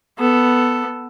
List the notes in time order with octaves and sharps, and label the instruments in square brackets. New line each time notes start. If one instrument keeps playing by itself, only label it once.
[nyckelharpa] B3 A4